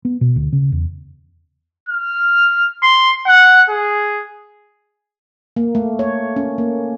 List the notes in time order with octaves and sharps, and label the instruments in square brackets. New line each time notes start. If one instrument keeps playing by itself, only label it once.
[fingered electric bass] B3
B2
D2
C#3
E2
[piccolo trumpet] F6
C6
F#5
G#4
[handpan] A#3
A3
C#5
C#4
A#3